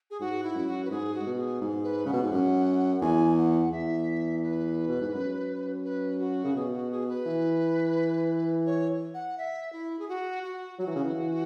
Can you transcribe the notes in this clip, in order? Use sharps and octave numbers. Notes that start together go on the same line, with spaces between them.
G#4
G#2 F#4
E4
F#2
F#4
B4
G#2 G#4
F#4
G#2
B2
G#4
G#2
B4
C#3 F#5
B2
G#2
F#2
F#5
E2 G#5
F#5
E2 E5
B4
B2
G#2
F#2
B4
F#4
C#3
B2 G#4
F#4
G#4
B4
E3
C#5
F#5
E5
E4
G#4
F#4
F#4
F#3 F#4
E3
C#3
E3